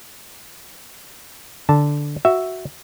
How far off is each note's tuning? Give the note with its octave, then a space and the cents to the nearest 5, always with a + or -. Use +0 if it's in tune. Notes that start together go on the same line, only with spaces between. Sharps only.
D3 -5 A5 +0
F#4 +0 E5 +0